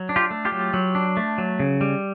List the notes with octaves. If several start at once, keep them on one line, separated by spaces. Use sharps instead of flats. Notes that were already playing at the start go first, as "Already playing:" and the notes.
Already playing: F#3
D4
F4 G4
A3
F4 G4
F#3
F#3
D4
A3
F#3
C#3
G3